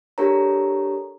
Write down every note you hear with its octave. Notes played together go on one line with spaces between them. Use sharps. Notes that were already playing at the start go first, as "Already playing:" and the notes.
D4 G4 A4 A#4 C#5 A#5